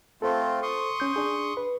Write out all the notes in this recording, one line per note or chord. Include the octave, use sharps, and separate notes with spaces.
A3 C4 F4 A4 C5
C6 C#6 D#6
C#4 G6
D4 G#4
B4